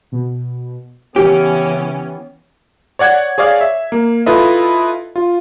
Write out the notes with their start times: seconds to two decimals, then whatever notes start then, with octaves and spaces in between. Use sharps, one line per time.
0.12 B2
1.16 C#3 E3 B3 C#4 G4
2.99 C#5 D5 F#5 G#6
3.38 G#4 C#5 D5 F5
3.61 E5
3.92 A#3
4.26 E4 F4 A4 B4 D#5
5.16 F4